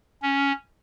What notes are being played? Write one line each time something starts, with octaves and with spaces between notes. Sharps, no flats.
C#4